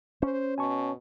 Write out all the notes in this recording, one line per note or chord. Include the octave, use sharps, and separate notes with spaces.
C#4 C5
B2 G#5 A5 C#6